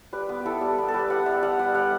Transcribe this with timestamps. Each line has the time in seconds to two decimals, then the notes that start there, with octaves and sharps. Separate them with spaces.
0.13 G3 B4
0.29 B3 B4
0.40 G4
0.46 E4 A4
0.61 G3 A4
0.78 B3 B4
0.88 A4
0.94 G3 B4
1.10 G3 F#5
1.26 G3 E5
1.43 G3 F#5
1.59 G3
1.74 G3 F#5